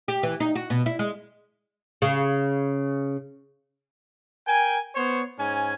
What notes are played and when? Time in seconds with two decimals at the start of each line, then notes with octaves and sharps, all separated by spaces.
0.08 G4
0.23 E3
0.40 D#4
0.55 F#4
0.70 B2
0.86 E4
0.99 G#3
2.02 C#3
4.47 A#4 G5 G#5
4.95 B3 C5 C#5
5.38 G#2 C#4 G#5